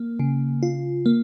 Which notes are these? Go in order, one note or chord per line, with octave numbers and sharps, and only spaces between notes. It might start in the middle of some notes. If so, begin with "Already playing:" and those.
Already playing: A#3
C#3
F4
A#3